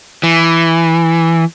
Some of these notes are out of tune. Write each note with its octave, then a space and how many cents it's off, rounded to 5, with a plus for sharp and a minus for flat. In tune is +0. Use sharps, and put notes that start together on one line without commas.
E3 +5